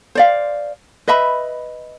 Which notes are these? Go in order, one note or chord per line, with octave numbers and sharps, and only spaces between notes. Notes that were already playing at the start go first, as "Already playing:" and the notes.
C5 D5 F5
B4 D#5 E5 B5